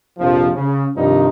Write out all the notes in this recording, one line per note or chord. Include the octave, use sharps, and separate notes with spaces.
A#1 F2 C3 F3
C#3
G2 C3 D#3 F3 G3 D#4